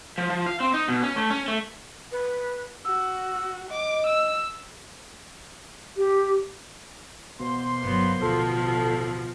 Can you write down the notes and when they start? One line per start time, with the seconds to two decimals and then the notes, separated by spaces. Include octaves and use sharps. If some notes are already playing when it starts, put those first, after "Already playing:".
0.18 F3
0.30 F3
0.46 F5
0.60 C4
0.74 D#4
0.88 B2
1.03 C#4
1.16 A3
1.30 C#4
1.48 A3
2.12 B4
2.85 F#4 E6
3.71 D#5 D6
4.07 E6
5.96 G4
7.39 B2 E3 A#3 C5 C6
7.84 G1 C2 F#3 B3
8.22 A1 D2 B2 F3 A4